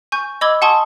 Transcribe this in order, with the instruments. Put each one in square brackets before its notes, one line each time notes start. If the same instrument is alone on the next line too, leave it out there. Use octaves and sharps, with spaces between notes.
[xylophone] G#5 C#6 G6
D#5 B5 D6 E6 G#6 G7
F#5 G#5 A5 C6 C#6 D#6